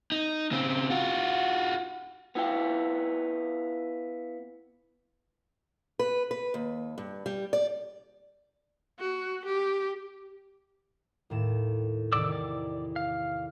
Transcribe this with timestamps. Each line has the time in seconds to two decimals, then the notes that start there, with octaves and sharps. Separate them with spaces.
0.12 D#4
0.52 C#3 C4
0.90 F4 F#4
2.35 B3 E4 F4 G5
5.99 B4
6.31 B4
6.54 D#2
6.98 G2
7.26 G3
7.53 D5
8.99 F#4
9.45 G4
11.30 D#2 A2 E7
12.13 E2 C3 D#3 D5 D6 E6
12.32 D5
12.96 F5